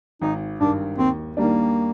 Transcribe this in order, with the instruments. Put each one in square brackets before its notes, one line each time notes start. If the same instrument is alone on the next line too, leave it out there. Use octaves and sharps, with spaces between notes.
[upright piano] G#1 [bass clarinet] D#4
[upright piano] G2 D#3 [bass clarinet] D4
[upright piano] D#2 [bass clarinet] C4
[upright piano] D#3 G3 D4 [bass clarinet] A#3